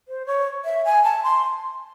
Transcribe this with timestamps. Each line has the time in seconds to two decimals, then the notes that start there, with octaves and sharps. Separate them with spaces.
0.08 C5
0.26 C#5
0.65 E5
0.85 G#5
1.03 A5
1.23 C6